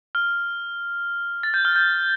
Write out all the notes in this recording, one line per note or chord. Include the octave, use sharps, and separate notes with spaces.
F6
A6
G6
F6
G6